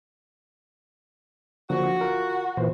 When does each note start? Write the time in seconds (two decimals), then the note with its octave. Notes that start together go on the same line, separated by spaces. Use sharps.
1.70 D3 F3 A#3 F#4
2.01 F4 A#4
2.57 A#2 E3 C5